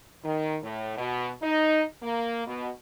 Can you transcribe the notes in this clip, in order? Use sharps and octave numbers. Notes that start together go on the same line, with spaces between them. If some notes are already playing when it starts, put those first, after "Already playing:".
D#3
A2
B2
D#4
A#3
B2